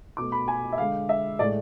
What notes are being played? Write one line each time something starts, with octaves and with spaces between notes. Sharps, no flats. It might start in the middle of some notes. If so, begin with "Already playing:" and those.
B2 A3 D6
B5
G#5
E5
D3 G#3 F5
E5
A2 G#3 D5